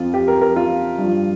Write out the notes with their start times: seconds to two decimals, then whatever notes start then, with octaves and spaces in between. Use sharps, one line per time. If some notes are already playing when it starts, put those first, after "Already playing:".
Already playing: F2 F3 F4
0.14 G4
0.28 A#4
0.41 A#4
0.56 F4
0.98 G2 F3